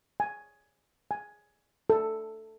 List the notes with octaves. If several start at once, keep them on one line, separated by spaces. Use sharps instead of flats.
G#5
G#5
A4